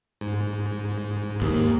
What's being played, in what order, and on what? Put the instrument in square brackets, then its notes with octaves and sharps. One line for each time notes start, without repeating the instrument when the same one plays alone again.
[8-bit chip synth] G#2
[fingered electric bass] D#2